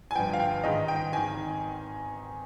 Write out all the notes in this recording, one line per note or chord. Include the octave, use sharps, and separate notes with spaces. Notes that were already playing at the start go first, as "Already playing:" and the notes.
G#5
G1 G2 F3 G5
F5
G5
G#2 D#3 G#3 D#4 D#5
G5
G#1 D#3 G#5